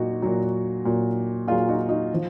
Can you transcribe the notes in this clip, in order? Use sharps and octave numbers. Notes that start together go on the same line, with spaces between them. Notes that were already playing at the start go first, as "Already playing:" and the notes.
Already playing: A#2 F#3 D#4 F#4
A#2 F#3
A#2 F#3
A#2 F#3 F4 G#4
D#4 F#4
D#4 F#4
F3